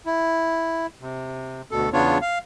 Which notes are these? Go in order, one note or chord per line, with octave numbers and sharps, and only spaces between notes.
E4
C3
D2 B2 A4
E2 C#3 B3 D4 F4 C#5
F5